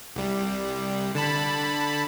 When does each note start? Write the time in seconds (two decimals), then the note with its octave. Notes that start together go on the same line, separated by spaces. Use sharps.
0.16 C2 G3
1.15 D3 A5 B5